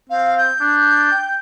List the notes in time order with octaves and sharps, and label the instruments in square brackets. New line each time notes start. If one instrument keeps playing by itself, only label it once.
[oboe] C4 [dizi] F5
[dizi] G6
[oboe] D4
G5